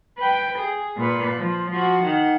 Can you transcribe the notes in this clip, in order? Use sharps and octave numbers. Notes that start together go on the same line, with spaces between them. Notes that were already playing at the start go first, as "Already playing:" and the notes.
B4 G5
G#4
A#2 B4
F3
F3 F#4
D#3 F#5